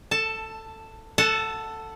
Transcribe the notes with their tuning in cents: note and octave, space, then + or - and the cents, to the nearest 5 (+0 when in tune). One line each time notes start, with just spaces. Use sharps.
A4 +15 A5 +0
A4 +10 F#5 +0 A5 -20